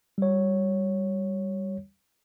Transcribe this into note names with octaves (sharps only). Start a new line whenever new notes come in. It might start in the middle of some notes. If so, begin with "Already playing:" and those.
G3 C#5